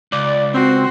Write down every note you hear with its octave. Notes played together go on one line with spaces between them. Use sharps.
C#2 D5
C4 F#4 C6